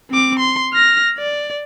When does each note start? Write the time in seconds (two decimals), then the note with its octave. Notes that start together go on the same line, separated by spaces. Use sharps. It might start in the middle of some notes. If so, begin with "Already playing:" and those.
0.10 C4 D6
0.39 C6
0.73 F6 A#6
1.18 D5